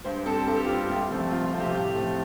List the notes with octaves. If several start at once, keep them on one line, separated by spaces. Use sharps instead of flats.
G2 C5
G3 C4 A4
G2 A4
G4
G3 C4 F4
G4
C2
C3 F3 A3 C4
C2 F4
F4
C3 F3 A3 C4
G4
A2 G4
F3 A3 C4